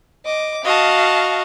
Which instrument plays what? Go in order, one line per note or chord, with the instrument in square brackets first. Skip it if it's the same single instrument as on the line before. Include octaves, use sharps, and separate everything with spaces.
[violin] D#5 D6
[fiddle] F#4 D#5 [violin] F5 A5